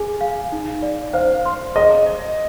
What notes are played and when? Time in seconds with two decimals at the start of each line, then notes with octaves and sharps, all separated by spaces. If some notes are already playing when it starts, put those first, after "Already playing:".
Already playing: G#4 G#5
0.21 F5
0.52 D#4
0.83 D5
1.13 C5 F5
1.46 C6
1.76 G#4 D#5
2.06 D#5